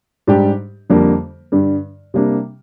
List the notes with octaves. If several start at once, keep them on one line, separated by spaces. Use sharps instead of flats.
G#2 G3 D4 G4
F2 D3 G3 A#3
G2 D3 G3
C3 G3 A#3 D4